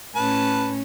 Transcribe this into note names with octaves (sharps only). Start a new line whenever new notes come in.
A2 C#4 B4 A5